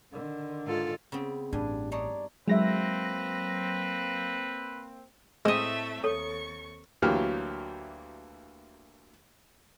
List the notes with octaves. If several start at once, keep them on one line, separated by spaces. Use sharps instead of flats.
D3 D#3
G#2 F4 A4
C#3 B3 C4
A1 G2 D4 G#5
D4 D#4 C#5 D5
F#3 G#3 A#3 C4 B4 E5 A#6
A2 G#3 A3 C4 D#5 E5
D#2 A4 C#5 C#6
D2 E3 F#3 A#3 G4 F6